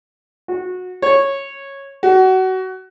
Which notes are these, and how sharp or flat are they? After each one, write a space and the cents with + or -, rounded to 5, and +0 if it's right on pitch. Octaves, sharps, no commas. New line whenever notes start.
F#4 -20
C#5 -10
F#4 +25